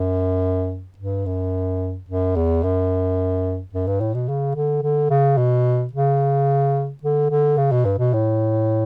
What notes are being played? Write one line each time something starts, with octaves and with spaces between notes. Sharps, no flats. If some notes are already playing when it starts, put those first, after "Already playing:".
Already playing: F#2
G2
F#2
F#2
E2
F#2
F#2
G2
A2
B2
C#3
D3
D3
C#3
B2
C#3
D3
D3
C#3
B2
G2
B2
A2